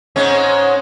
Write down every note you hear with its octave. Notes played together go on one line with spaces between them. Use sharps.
G#2 G#3 C#4